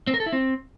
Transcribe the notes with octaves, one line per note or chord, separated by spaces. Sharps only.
C4
A#4
A4
E4
C4